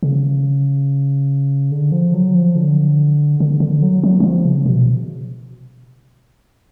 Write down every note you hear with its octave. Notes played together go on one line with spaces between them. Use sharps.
C#3
D3
F3
F#3
F3
D3
D3
D3
F#3
F#3
F#3
F3
C#3
B2